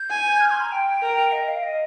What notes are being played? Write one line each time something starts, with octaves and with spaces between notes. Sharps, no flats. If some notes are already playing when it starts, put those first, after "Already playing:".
Already playing: G6
G#5
F6
C6
A#5
G5
A#4
D#5
F5
D#5